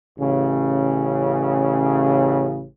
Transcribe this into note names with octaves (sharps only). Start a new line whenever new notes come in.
A1 C#3